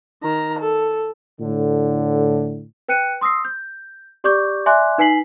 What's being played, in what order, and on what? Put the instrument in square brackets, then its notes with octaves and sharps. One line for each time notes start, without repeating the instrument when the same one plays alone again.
[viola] D#3 A#5
A4
[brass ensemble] A2 D3
[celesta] B4 G5 F#6 C#7 D#7
C6 D#6 E6 A#6 C7
G6
G4 D5 C#6 D6 G6
D5 E5 G#5 C6 D6 F#6
D#4 B4 G#5 B6 C7 F#7